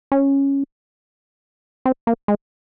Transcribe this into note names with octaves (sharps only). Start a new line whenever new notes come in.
C#4
C4
A#3
G#3